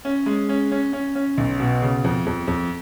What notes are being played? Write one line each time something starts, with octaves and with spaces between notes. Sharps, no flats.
C#4
G#3
C#4
C#4
C#4
C#4
B1
B2
C#3
F2
F2
F2